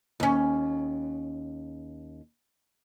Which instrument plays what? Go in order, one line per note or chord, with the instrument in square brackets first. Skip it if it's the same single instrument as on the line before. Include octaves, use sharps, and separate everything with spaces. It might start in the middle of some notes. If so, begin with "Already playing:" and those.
[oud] D#2 C#4